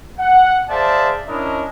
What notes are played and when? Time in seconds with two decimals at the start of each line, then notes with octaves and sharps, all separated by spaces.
0.19 F#5
0.70 G#4 C5 D5 E5 F5 A5
1.27 C#4 D4 E4 A#4 D#5